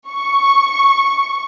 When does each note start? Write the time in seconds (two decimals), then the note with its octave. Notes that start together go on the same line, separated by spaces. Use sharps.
0.11 C#6